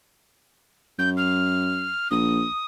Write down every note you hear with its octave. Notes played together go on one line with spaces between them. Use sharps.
F#2 G6
F6
A#1 D#6